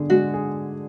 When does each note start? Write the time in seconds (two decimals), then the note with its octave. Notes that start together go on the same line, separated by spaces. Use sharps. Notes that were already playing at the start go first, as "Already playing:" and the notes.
Already playing: D3 D4 G#4
0.10 G#3 F#4
0.34 G#4